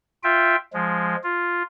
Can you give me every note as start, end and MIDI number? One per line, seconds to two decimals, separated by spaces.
0.23 0.56 65
0.23 0.56 76
0.23 0.56 79
0.73 1.15 53
0.73 1.15 56
1.23 1.62 65